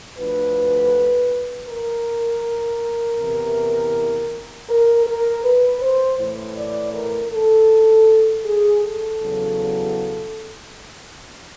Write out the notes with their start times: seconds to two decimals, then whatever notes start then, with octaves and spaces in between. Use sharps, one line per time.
0.18 D2 D3 F3 B4
1.69 A#4
3.20 E2 C3 E3
4.69 A#4
5.07 A#4
5.45 B4
5.82 C5
6.20 A2 E3
6.57 D5
6.95 A#4
7.32 A4
8.45 G#4
8.83 A4
9.20 E2 C#3 F#3